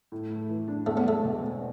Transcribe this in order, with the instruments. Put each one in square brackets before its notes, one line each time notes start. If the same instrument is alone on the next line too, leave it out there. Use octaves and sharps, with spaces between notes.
[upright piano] A2
A3
E3
D4
[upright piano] E2 [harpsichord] A3
[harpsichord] B3
[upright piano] G#3 [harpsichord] A3
[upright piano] B2
C4